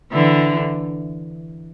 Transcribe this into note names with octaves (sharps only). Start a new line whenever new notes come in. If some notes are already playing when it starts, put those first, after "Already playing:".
D3 E3